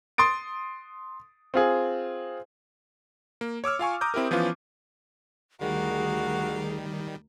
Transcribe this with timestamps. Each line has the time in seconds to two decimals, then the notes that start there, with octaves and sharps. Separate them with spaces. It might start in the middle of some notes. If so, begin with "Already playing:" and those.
0.18 C6 D#6 A6 D7
1.54 C4 F4 G#4
3.41 A#3
3.64 C#5 D6 E6 F6
3.79 F4 F5 G#5 C#6
4.01 A#5 D6 D#6 G6
4.14 C4 E4 G4 A#4
4.31 E3 F3 B3 C#4 F4
5.61 D2 D#3 G3 F#4 G#4 A#4 F5